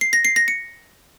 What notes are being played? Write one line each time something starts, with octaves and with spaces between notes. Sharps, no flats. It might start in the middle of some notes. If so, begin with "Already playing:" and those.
C7
A#6
C7
A#6
C#7